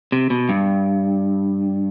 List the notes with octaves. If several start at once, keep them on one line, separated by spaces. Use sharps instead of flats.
C3
B2
G2